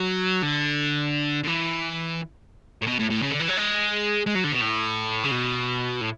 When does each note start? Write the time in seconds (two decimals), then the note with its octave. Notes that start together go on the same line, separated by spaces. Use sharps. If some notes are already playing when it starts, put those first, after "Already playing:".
Already playing: F#3
0.42 D3
1.44 D3
1.47 E3
2.82 A2
2.87 B2
2.99 A2
3.10 A2
3.22 C#3
3.31 D3
3.40 E3
3.48 F#3
3.57 G#3
4.26 G#3
4.35 F#3
4.44 D3
4.53 B2
4.61 A2
5.24 C#3
5.31 B2
6.01 A2